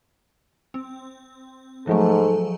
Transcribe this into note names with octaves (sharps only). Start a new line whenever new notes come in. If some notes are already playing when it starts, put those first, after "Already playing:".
C4
G#2 F3 F#3 A3 A4